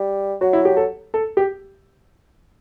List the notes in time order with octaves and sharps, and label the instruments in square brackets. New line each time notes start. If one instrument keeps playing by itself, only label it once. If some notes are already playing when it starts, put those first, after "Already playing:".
Already playing: [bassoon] G3
[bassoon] F#3 [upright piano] F#4
[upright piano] E4
G4
A4
A4
G4